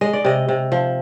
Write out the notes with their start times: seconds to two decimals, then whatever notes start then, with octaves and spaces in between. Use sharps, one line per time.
0.01 G#3 D#5
0.13 D5
0.25 C3 D#5
0.49 C3
0.72 F3